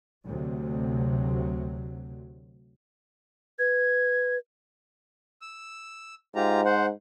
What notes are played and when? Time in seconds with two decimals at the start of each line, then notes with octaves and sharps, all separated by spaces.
0.25 D2 C3 F#3
3.59 B4 G#6
5.41 E6
6.35 G#2 F4 G4 A#5
6.65 C5 F#5